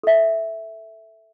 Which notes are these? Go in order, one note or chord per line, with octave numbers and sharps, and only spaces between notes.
A4 E5